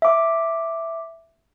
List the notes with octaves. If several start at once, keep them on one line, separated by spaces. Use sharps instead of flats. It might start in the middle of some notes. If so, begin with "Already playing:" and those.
E5 D6